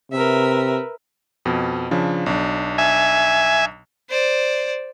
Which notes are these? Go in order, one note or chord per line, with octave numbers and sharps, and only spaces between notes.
C3 A#4 B4 E5
F2 B2
C#3 F3 D4
B1 D4
E5 G#5
C5 D5